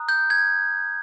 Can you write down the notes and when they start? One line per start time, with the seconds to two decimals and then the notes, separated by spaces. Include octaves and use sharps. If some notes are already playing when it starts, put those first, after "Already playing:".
Already playing: A#5 D#6 F#6
0.09 G6
0.30 G#6